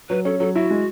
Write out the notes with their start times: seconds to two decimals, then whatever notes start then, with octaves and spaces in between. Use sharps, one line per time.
0.09 F#3 B4
0.25 C#4 A4
0.39 F#3 A4
0.55 E4 F#4
0.70 G#3